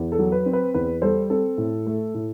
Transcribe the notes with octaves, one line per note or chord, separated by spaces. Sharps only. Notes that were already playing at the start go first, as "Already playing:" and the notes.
Already playing: E2
A4
F#3
B4
C4
B4
E2 B4
G3 A4 C5
C4 A4
A2
A3
A2